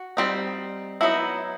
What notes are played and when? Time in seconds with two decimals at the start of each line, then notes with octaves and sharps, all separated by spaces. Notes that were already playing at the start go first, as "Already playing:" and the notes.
Already playing: F#4
0.17 G3 C4 D#4
1.01 F#3 B3 D#4 E4